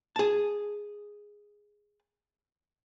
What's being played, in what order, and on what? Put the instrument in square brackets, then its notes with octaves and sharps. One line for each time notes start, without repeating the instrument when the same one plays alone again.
[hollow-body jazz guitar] G#4 A5